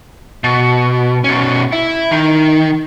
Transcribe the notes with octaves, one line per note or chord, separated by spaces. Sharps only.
B2
B2 C#4
E4
D#3